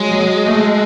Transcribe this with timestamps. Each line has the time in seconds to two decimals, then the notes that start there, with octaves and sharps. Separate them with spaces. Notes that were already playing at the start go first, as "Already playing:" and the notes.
Already playing: F#3 G#3
0.11 F#3
0.47 A3